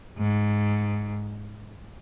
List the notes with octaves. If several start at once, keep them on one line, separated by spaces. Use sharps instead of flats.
G#2